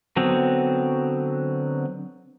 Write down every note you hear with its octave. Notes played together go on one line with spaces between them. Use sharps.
D3 F#3 B3 C4